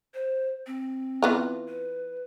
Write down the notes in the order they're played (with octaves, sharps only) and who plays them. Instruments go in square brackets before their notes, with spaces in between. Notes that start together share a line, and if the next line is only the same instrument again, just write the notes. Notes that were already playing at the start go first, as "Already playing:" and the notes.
[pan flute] C5
C4
[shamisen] E3 B3 F4
[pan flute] B4